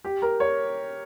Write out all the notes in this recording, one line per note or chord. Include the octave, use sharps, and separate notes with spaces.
G4
A#4
C#5